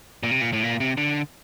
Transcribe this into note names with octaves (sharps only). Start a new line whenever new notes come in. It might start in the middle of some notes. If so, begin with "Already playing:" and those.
A#2
C3
A#2
A2
A#2
C3
D3